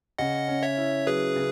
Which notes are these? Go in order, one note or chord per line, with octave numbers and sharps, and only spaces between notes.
C#3 D#5 F#5
C#4
C#5 E5
E4
F#3 G#4 B4
C#3